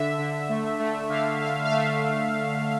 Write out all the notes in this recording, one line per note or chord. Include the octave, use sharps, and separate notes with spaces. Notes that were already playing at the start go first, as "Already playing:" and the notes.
Already playing: D3 E5
D3
A3
A3
D3 F5
D3 F5
F5
A3 E5
A3